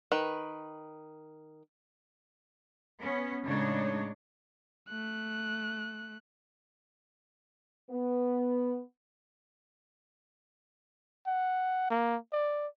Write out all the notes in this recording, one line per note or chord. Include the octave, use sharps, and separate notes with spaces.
D#3 B4
B3 C#4
A2 C#3 G#3 D4 D#4 C#5
A3 F#6
B3
F#5
A#3
D5